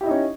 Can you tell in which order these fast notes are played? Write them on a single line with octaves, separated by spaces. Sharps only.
G4 E4 D#5 D#4 C#4